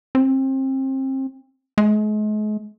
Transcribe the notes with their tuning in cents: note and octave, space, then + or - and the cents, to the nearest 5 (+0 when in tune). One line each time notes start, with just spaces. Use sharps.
C4 +30
G#3 +40